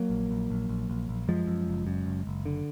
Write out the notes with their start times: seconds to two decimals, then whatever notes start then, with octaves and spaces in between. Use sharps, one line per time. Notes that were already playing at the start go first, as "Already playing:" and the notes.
Already playing: F#3 A#3
0.10 A#1
0.31 A#1
0.50 A#1
0.69 A#1
0.90 A#1
1.09 A#1
1.28 F#2 F3 G#3
1.47 F#2
1.68 F#1
1.87 F#2
2.06 F#1
2.27 F#1
2.46 D3